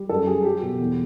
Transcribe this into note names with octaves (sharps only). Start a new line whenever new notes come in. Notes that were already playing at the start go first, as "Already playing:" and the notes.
Already playing: G3
F#2 A4
G3 G#4
F#3 G4
B2
E2